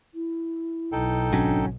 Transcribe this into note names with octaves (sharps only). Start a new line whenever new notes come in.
E4
B1 D#4 A4 G5
G#1 F#3 C#4 D4